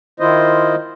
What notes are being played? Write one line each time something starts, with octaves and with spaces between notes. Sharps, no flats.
D#3 E4 F4 C5 D#5